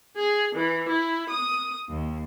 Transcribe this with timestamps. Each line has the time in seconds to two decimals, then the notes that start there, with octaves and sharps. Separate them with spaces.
0.15 G#4
0.54 E3
0.89 E4
1.29 D#6
1.89 D#2